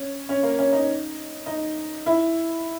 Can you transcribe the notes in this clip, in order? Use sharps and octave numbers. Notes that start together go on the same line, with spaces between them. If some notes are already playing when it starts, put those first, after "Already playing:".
Already playing: C#4
C#4
A#3
C#4
D#4
D#4
E4